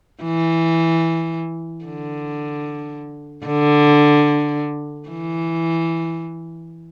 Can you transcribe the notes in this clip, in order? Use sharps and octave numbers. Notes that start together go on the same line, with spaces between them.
E3
D3
D3
E3